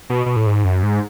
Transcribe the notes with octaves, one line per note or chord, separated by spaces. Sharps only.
B2
B2
A2
G#2
F#2
G#2